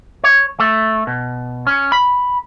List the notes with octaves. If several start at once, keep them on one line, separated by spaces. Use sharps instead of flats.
C#5
A3
B2
C#4
B5